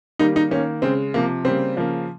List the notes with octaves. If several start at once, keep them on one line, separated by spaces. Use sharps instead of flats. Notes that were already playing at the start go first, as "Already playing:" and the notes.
D#3 G3 A#3 D#4
D#4
D#3 A#3 C#4
C#3 G#3 C4
C3 F3 A#3
C#3 G3 A#3 C4
C#3 F3 A#3